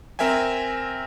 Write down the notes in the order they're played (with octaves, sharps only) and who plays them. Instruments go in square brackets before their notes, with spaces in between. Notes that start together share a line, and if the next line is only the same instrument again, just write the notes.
[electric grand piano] C4 A#4 E5 G5 G#5